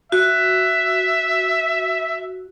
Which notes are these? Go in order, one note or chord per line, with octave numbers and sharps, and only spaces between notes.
F#4 E5